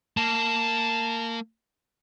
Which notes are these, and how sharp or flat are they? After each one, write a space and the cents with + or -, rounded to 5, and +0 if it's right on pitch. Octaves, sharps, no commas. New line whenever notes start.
A#3 -20 A5 +0